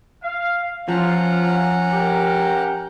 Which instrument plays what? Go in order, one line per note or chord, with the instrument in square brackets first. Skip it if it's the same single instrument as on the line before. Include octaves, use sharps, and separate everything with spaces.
[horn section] F5
[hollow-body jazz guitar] F3 [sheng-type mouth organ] C#4 F#5 A#5 [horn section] F4 C5
[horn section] G4 A#4